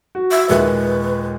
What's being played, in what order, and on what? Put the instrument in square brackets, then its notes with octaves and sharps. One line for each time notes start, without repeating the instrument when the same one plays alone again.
[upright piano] F#4
[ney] E5
[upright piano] D#2 A#2 G#3 [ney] B4